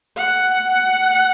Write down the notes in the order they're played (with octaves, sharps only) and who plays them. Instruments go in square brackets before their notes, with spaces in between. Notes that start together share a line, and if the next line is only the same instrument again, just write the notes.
[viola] F#5